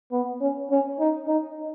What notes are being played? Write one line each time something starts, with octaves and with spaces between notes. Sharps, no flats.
B3
C#4
C#4
D#4
D#4